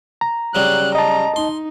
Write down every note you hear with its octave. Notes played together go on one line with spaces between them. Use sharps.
A#5
C#3 F#3 G3 F#6
D#5 A5 A#5
D#4 C6